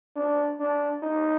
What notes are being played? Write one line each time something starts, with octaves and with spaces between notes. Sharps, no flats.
D4
D4
D#4